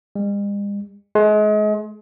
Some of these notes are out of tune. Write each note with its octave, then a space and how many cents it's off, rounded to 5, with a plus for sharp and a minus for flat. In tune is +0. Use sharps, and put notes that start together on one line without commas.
G#3 -45
G#3 +35